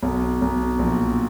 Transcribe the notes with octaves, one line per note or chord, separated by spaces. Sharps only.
B1
B1
A#1